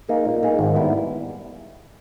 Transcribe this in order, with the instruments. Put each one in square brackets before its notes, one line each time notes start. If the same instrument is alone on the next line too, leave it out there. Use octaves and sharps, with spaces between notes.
[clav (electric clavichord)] A#3 D#4 G#4
A#2
A#3 D#4 G#4
G#1
G#2 G3 B3 E4